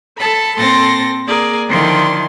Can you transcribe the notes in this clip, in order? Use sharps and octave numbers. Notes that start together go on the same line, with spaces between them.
A4 A5 B5
A#2 C4 A4 C6 A6 A#6
A#3 G#4 A#4 D5
D3 D#3 F3 E4 D5 C6